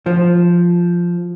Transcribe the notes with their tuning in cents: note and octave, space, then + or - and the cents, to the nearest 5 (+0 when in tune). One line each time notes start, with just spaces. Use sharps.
F3 -5